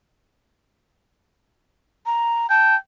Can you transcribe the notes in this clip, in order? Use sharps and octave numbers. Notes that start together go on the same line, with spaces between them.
A#5
G5 A5